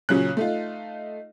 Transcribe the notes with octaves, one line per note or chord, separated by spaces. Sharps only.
A#2 C#3 F#3 C#4 F#6
A3 D#4 F4